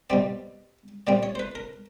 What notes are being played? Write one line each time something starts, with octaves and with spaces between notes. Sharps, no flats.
B2 G3 C4 D5
A#2 G3 C4 D5
C#5
C5
B4
A#4